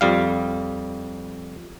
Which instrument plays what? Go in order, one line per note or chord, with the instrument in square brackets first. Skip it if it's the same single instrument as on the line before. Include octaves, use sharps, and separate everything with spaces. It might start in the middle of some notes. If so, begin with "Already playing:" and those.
[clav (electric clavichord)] F2 G3 F5